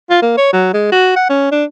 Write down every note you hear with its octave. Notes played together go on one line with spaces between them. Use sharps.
F4
A#3
C#5
F#3
G#3
F#4
F#5
C#4
D4